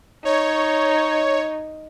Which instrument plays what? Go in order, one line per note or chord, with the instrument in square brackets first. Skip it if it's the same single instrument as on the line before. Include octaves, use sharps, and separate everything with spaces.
[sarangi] D#4 [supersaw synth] C#5